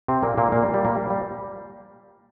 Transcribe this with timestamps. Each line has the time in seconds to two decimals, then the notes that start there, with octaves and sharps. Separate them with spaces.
0.08 C3 C4
0.23 A#2 A#3
0.38 A#2 A#3
0.52 A#2 A#3
0.63 G3
0.74 G3
0.85 A#2 A#3
0.95 G3
1.10 G3